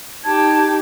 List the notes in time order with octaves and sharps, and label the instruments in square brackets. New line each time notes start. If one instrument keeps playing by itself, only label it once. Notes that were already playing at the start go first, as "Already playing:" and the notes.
[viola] D#4 G4 [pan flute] A5 [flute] G#6